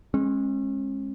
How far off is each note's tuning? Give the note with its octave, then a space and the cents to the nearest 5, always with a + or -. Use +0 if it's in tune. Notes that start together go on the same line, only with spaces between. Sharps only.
G#3 +0 C#4 -40